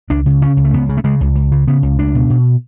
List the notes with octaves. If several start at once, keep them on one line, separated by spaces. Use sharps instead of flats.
C#2 D4
C#3
C#3 C#4
C#2
A3
C#2 B3
C#3
A3
C#3 G#3
C#2
C#2
C#3
C#3 B3
C#2
C#2 D4
B2
B2